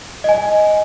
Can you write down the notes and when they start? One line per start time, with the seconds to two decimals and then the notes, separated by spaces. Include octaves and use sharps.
0.24 D#5 G#5